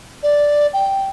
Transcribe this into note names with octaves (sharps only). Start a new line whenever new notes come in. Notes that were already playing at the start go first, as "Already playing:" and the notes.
D5
G5